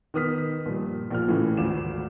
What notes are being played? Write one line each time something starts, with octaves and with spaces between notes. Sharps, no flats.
D#3 B3 D#6 F6 B6
G2 A#2 F3
A#1 A#2 F3 F6
A2 C#3 E3 A3
G#1 D2 F4 D6 E7